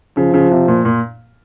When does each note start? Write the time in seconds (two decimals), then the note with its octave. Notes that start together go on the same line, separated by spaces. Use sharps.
0.17 C#3 F3
0.34 C#3
0.51 C3
0.68 A#2
0.85 A#2